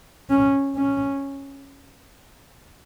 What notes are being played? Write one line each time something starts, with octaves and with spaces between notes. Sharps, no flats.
C#4
C#4